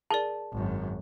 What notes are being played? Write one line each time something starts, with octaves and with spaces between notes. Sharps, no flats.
G#4 A#4 D5 A5
G#1 F#2